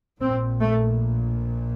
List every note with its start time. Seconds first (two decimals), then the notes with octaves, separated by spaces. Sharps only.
0.20 A#1 A#2 C4
0.61 A3